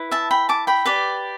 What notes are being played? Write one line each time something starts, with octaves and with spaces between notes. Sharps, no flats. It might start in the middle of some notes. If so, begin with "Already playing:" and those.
Already playing: E4 B4
E5 A5
G5 B5
A5 D6
G5 B5
G4 B4 D5